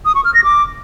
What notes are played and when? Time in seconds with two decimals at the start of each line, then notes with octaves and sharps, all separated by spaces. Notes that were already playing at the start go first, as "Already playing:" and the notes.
0.05 D#6
0.15 C#6
0.25 F6
0.34 A#6
0.44 D6